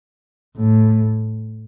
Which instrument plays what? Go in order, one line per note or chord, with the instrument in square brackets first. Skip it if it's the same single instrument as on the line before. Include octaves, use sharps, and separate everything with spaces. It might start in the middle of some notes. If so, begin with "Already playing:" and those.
[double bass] A2